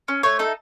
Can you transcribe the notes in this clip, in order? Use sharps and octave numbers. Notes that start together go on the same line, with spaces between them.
C#4
A3 C#5
D#4 A4